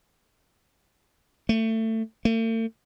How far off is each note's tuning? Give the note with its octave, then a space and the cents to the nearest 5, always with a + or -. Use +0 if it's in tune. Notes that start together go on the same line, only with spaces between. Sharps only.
A3 +25
A3 +45